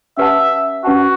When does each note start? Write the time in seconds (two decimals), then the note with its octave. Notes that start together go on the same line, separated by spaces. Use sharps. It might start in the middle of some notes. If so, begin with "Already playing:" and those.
0.17 C#4 G4 B4 E5 F#5 A5
0.84 C#4 F#4 G4 B4 F#5 A5